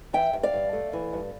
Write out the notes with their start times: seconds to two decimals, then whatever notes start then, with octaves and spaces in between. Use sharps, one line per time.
0.13 E3 E5 G5
0.33 G2
0.43 D5 F5
0.53 G2
0.73 A3
0.93 E3
1.13 G2